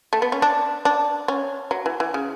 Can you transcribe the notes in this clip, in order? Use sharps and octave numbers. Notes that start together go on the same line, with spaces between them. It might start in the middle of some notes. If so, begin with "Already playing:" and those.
A3
B3
C#4
D4
D4
C#4
F#3
E3
E3
C#3